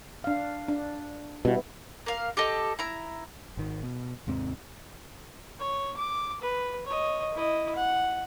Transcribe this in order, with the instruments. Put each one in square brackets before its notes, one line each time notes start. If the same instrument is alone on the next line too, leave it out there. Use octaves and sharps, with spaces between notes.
[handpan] D4 F5
D4
[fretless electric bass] B2 [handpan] G3 B3 E4
[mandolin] A#3 F5
G4 A4 D#5
E4 A#5
[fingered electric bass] G#1 D#3
B2
D#2 G#2 C3 C4
[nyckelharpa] C#5
D6
B4
C#5 D#5
E4 D#5
F#5